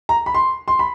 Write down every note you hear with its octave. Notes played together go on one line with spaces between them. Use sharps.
A#5
B5
C6
C6
B5